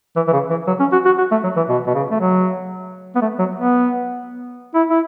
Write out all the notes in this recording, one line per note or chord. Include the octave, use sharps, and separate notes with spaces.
E3
E3
C#3
E3
F#3
C#4
F#4
F#4
F#4
A3
F#3
E3
B2
B2
C#3
A3
F#3
B3
A3
F#3
B3
E4
E4